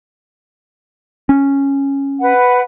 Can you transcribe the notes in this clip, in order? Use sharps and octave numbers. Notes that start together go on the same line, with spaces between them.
C#4
B4 F#5